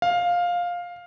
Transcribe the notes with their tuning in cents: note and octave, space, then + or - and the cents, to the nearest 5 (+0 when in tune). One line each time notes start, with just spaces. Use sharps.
F5 +10